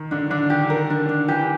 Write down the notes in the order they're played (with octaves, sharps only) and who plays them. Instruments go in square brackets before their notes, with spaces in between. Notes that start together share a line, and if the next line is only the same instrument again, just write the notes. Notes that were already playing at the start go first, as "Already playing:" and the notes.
Already playing: [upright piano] D#3
[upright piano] D3 [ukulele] D4
[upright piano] D3 [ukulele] D4
[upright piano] D#3 [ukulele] G4
[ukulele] A#4
D4
D4
[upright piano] E3 [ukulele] G4